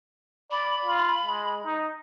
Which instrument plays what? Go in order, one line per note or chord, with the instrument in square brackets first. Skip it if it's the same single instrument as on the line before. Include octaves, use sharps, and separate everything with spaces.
[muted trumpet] D5 [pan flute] B5
[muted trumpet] F4
G#3
D#4